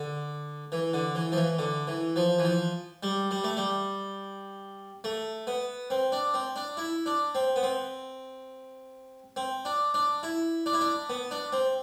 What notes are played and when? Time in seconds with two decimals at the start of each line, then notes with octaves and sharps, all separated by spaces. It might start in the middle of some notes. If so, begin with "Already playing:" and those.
Already playing: D3
0.72 E3
0.94 D3
1.15 E3
1.32 F3
1.37 E3
1.59 D3
1.87 E3
2.16 F3
2.39 E3
2.45 F3
3.03 G3
3.31 G3
3.44 A3
3.57 G3
5.04 A3
5.47 B3
5.90 C4
6.12 D4
6.34 C4
6.56 D4
6.77 E4
7.06 D4
7.35 C4
7.56 B3
7.63 C4
9.36 C4
9.65 D4
9.94 D4
10.23 E4
10.66 D4
10.73 E4
10.81 D4
11.09 B3
11.31 D4
11.53 C4